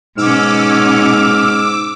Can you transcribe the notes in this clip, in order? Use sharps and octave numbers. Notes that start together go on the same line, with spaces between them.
G#2 B2 C#4 D6 E6 F6